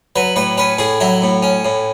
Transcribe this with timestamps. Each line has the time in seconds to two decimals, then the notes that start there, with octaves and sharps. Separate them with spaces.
0.16 F#3 B4
0.36 A2 B4
0.58 C#4 B4
0.78 A2 G#4
1.00 F#3 E4
1.22 A2
1.43 C#4
1.65 A2